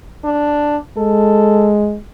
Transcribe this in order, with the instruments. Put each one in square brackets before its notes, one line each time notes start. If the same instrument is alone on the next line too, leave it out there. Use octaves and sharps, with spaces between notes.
[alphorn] D4
[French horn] G#3 [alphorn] A4